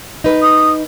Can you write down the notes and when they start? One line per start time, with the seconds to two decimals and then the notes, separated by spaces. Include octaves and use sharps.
0.24 D#4 B4
0.42 D#6